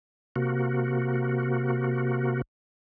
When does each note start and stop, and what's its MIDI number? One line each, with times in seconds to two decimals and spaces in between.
0.36 2.42 48
0.36 2.42 58
0.36 2.42 66